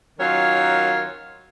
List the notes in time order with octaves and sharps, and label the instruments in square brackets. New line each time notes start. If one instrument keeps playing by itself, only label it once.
[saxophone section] D#3 F#3 C#4 F4 A#4 C#5